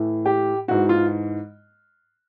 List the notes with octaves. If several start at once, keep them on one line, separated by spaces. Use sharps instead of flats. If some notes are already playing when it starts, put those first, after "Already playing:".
Already playing: A2 E3
G4
G#2 E3 F#4
F4